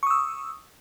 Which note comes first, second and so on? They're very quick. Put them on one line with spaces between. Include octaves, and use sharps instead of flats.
C#6 D#6 E6